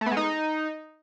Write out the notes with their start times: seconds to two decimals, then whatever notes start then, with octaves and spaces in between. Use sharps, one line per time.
0.01 A3
0.06 B3
0.12 G#3
0.17 D#4